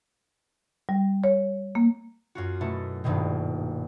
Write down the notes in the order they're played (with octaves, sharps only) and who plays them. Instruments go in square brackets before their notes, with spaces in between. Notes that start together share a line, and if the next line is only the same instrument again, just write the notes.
[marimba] G3
C#5
A#3
[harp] F#2 F4 F#4
B2 A3 E4 A4
D#1 A#1 G2 B2 D#3